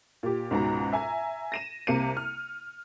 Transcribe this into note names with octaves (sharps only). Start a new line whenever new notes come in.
A#2 G4
C#2 G#2 B2 A#5
E5 G#5 A#5
A#6 D#7 E7
C2 C3 A#3 C#7 D#7
F6